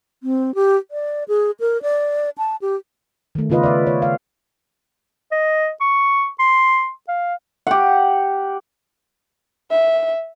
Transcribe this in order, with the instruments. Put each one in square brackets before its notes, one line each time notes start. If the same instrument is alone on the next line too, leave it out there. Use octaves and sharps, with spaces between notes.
[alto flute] C4
G4
D5
G#4
A#4
D5
A5
G4
[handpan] D#3 A3
C#3 B3 F4 B4 D#5
D5 E5
C#5
F5
[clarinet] D#5
C#6
C6
F5
[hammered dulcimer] G4 F#5
[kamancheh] E5